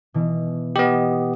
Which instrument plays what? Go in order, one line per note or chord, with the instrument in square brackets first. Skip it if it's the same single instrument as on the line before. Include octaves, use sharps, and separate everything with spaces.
[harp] B2 E3
[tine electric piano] B3 G4 [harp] D#5